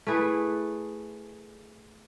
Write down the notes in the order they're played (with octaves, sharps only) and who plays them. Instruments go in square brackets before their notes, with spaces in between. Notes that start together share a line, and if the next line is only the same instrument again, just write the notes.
[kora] A3 E4 G#4 B4